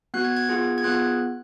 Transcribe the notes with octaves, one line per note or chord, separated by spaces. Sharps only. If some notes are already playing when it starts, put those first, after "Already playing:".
B3 F#4 F#6
G#6
G#6
B3 F4 G#4
G#6
B3 F4 G#4 F#6